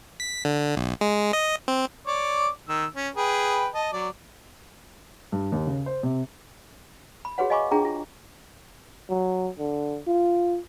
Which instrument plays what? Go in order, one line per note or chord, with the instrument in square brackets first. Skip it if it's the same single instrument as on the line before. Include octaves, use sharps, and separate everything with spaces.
[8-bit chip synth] B6
D3
B1
G#3
D#5
C4
[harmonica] C#5 D5 D6
D#3 E6
C#4
G#4 B4 G5
D#5 A5
F#3 D5
[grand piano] G2
D#2
C#3
C5
C3
[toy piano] B5
F#4 G#4 B4 C#5 F#5
D#5 F5 G#5 B5 C#6 D6
D4 F4 G#4 G5 A#5
F4
[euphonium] F#3
D3
F4